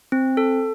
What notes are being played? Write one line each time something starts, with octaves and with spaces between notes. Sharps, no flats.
C4
A4